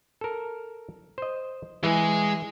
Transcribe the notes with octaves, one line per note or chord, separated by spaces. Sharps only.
A4 A#4
C5 D#5
E3 G#3 G#4